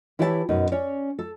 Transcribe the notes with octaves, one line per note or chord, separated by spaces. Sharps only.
E3 E4 G4 C#5 F5 A5
F#2 B2 D#4
C#4 C#5 D5
A4